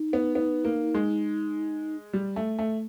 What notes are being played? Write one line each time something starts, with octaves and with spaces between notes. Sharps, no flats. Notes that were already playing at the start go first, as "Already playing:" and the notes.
Already playing: D#4
B3
B3
A#3
G#3
G3
A3
A3